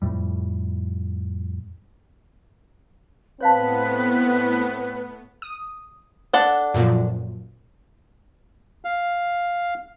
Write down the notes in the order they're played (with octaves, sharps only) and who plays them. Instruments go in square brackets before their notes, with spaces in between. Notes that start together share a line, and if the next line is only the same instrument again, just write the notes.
[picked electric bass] F2 A2 G3
[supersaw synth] A2 B3 [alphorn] C4 [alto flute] B4 [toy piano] C#5 F5 A5
[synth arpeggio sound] D#6
[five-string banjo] D4 A4 F#5
[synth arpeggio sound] F#2 A#2 F3
[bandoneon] F5